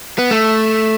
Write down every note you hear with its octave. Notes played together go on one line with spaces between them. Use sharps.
B3
A3